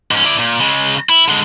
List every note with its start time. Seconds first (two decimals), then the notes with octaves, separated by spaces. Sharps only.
0.11 G#2 C#4
0.25 E4 D5
0.39 A#2
0.61 C#3 G#3
1.09 E4
1.28 D3 G#3